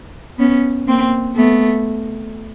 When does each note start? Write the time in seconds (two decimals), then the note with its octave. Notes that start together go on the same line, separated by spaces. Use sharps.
0.38 B3 C#4
0.87 A#3 C4
1.36 A3 B3